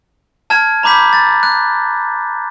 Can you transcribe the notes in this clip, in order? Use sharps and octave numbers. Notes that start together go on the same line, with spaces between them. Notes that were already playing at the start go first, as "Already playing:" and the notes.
A5 F6 G#6 E7
A#5 B5 D6 G6 B6
A6
F#6